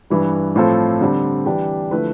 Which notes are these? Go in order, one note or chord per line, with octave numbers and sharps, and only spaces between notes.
G2 E3 G3
A2 F3 C4 F4 A4
D3 G3 C4
E3 G3 D4 G4
D3 F3 A3 E4 B4